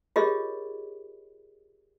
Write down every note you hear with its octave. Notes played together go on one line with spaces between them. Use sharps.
F4 G4 G#4 A#4 C#5 D#5